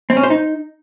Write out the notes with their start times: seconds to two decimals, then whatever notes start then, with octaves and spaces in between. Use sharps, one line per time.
0.10 C4
0.17 C#4
0.23 C5
0.30 D#4